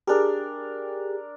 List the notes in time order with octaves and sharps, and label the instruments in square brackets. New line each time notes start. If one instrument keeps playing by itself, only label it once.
[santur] D4 A#4 [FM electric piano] G4 G#4